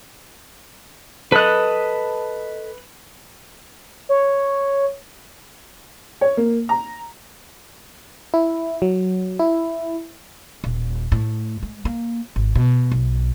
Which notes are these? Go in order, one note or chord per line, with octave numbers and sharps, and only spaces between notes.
A4 B4 D#5 F#6
C#5
C#5
A#3
A#5
E4
F#3
E4
D#1
A2
G#3
A#3
G#1
B2
B1